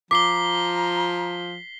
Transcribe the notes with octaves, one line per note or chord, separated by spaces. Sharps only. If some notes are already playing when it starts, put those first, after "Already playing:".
F3 A#5 D6 B6 C7 G7